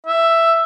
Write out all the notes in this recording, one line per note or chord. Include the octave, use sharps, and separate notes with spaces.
E5